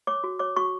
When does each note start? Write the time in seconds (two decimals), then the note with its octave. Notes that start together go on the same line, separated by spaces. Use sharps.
0.07 C#5 D6
0.24 F#4
0.39 C#5 D6
0.56 F#4 C#6